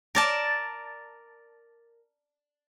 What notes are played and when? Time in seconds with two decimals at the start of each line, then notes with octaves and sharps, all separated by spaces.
0.15 A#4 D5 A5